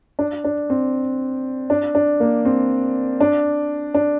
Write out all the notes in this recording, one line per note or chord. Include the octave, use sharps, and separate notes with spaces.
D4
D4
C4
D4
D4
A#3
C4
D4
D4